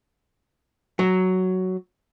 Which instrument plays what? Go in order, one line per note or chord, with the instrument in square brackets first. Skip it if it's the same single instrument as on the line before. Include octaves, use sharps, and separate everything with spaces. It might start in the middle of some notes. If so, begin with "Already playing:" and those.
[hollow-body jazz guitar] F#3